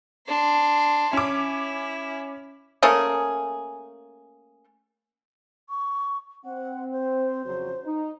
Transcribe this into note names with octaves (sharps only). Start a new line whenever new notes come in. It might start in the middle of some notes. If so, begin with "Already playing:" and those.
D4 C6
C#4 E4 D6
A3 A#3 C#4 G#4
C#6
C4 F#5
C5
F2 C#3 F#3
D#4